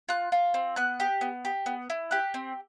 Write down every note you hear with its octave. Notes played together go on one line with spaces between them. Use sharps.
F4 F#6
F4
C4
B3 F#6
G4
B3
G4
B3
E4
G4 F#6
C4